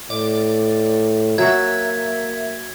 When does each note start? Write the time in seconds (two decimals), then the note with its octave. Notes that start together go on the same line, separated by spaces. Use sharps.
0.10 A2 D5
1.38 F#3 A#3 F#4 E5 G#6